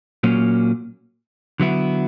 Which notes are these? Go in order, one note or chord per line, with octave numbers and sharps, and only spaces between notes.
A#2 F#3 A#3 C#4
D3 F#3 B3 E4